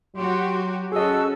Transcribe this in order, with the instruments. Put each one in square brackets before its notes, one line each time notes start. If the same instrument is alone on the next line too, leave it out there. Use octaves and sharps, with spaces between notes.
[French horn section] F#3 [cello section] F#4 G4 [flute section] C6
[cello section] C#4 [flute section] F#4 A4 E6 [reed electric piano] G#4 D#5